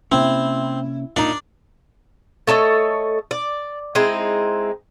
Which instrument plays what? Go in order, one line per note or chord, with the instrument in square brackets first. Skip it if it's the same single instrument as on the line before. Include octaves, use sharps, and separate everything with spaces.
[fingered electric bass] C3 A#3 C#4 [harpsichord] C4 [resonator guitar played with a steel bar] E4
[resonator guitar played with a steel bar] A#2 D#4 [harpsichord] D4 D5
[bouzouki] A3 A4 C#5 D#5
D5
G#3 C4 D#4 E4